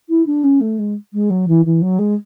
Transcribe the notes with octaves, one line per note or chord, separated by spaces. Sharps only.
E4
D4
C#4
A3
G#3
G#3
F#3
E3
E3
F#3
G#3